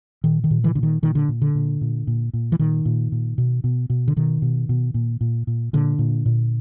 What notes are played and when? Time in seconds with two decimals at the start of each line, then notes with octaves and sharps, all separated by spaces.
0.24 A#2 D#3
0.44 D#3
0.51 A#2
0.64 D3 E3
0.75 A#2 D3
0.83 D#3
1.02 A#2 D#3
1.15 D3
1.29 A#2
1.42 D3
1.55 A#2
1.81 A#2
2.07 A#2
2.33 A#2
2.52 E3
2.59 A#2 D#3
2.85 A#2
3.12 A#2
3.38 B2
3.64 B2
3.90 B2
4.08 D3
4.16 B2 D#3
4.42 B2
4.69 B2
4.94 A#2
5.21 A#2
5.47 A#2
5.73 A#2 D3
5.99 A#2
6.26 A#2